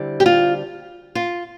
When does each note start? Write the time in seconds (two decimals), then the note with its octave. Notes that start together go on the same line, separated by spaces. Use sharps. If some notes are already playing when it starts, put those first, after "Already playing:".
Already playing: D3 G3 C4 E4
0.20 G4
0.26 F4
1.15 F4